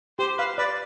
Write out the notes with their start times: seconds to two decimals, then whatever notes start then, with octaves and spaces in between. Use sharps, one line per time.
0.19 G4 C5
0.38 B4 F5
0.58 B4 D5